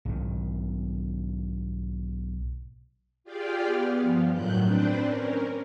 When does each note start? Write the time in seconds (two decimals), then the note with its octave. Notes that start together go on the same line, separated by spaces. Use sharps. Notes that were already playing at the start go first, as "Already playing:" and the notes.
0.05 B1 G#2 D#3
3.24 F4 G4 G#4 D5 F5 G5
3.65 B3
4.01 G2 F3
4.32 F#2 A2 D#3 F#3 F#6 G6
4.63 C4 D4 B4 C5 D5
5.00 C#4 A#4